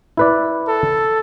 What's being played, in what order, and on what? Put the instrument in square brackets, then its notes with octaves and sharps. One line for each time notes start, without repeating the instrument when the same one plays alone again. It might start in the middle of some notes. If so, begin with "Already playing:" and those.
[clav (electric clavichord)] E4 B4 D5
[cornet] A4